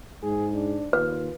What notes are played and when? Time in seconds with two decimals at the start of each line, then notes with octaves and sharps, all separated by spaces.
0.23 G#2 G#4
0.53 D4
0.93 D#2 F4 B4